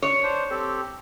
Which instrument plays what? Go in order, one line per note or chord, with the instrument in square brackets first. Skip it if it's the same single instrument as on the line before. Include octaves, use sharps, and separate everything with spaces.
[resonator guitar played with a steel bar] C#5
[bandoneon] D4 C5
C4 G4 A4